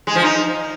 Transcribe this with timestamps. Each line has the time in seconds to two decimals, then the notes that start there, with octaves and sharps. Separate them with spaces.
0.07 G#3
0.15 F3
0.24 D#4